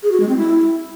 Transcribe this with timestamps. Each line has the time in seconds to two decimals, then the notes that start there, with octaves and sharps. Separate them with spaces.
0.03 G#4
0.12 F#4
0.20 G#3
0.29 C4
0.37 E4